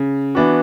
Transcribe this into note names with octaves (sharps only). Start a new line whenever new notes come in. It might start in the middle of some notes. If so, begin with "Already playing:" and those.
Already playing: C#3
E3 B3 D4 F#4